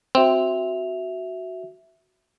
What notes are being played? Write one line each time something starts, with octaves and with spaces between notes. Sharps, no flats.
C4 F#4 E5 F7